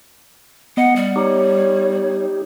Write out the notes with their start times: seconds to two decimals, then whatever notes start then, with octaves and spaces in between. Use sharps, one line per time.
0.77 B3 D#5 F#5
0.96 G3
1.16 D#4 G4 C#5